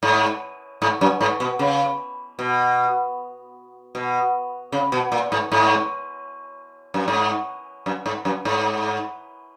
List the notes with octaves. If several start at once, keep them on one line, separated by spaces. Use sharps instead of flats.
G#2
G#2
F#2
G#2
B2
C#3
B2
B2
C#3
B2
A#2
G#2
G#2
F#2
G#2
F#2
G#2
F#2
G#2